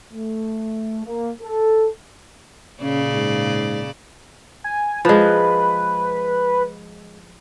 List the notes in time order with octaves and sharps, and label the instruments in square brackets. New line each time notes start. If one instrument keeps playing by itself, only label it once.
[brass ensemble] A3
A#3
A4
[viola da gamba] A#2 C#3 D5 [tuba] C#4
[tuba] G#2
[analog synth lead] G#5
[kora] F3 G#3 [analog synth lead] B4